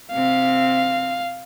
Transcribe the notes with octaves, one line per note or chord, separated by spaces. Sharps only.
C3 C4 F5